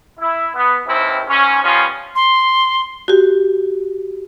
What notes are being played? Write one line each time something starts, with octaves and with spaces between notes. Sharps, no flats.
E4
B3
D#2 D#3 E3 C4 E4
G#2 C#4
F3 G3 B3 C#4 F4
C6
F#4 G4